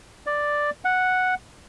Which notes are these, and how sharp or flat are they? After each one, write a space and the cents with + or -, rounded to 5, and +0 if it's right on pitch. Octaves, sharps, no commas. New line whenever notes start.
D5 +5
F#5 -5